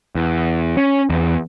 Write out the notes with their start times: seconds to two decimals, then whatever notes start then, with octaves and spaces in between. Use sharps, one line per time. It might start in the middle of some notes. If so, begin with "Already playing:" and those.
0.15 E2
0.77 C#4
1.10 E2